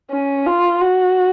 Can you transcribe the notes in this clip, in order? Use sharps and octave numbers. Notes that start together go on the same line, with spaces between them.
C#4
F4
F#4